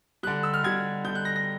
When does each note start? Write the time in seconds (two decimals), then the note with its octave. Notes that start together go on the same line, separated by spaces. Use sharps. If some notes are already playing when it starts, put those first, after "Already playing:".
0.23 D3 G3 F#6
0.43 E6
0.54 F6
0.63 D3 G3 G#6
1.05 D3 G3 G6
1.15 F#6
1.25 A#6
1.36 A#6